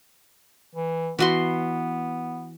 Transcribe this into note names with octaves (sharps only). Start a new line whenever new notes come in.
E3
E3 B3 F#4 C6